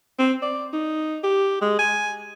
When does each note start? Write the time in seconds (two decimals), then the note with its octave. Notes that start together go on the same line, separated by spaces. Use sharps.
0.19 C4
0.42 D5
0.73 D#4
1.23 G4
1.61 G#3
1.79 G#5